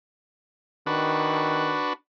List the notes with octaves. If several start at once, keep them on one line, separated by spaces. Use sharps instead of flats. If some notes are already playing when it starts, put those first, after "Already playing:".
D#3 D4 F#4 B4